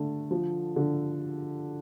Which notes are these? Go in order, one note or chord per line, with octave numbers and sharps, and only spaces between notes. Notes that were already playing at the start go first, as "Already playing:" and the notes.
Already playing: D3 A3
F3
D3